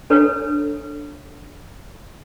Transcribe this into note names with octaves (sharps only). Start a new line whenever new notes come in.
D4 A4 B4 C#5